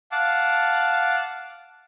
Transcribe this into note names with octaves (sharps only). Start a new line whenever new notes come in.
F5 F#5 A5 D6